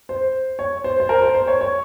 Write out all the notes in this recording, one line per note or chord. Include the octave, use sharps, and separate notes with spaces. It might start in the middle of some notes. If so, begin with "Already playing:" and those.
C5
C#5
C5
C5
A#4
C5
C5
C#5
C#5